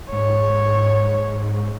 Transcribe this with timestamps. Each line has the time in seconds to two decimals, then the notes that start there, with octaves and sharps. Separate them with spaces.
0.12 G#2 C#5